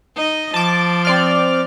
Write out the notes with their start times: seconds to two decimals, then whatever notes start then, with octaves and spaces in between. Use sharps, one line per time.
0.15 D#4 D#5
0.54 F3 A5 D6
1.05 C4 D5 F6